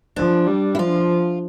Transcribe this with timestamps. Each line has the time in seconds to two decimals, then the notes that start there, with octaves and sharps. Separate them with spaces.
0.16 F3 D4
0.47 G3
0.75 E4
0.79 F3 F4